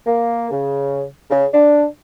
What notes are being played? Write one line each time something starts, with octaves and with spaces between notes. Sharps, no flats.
A#3
C#3
C#3
D4